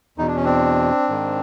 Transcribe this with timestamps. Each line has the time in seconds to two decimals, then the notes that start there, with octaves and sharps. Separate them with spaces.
0.18 E2 B2 D#4
0.27 D4
0.36 C#4
0.44 C4 D4
1.09 G#2 D#3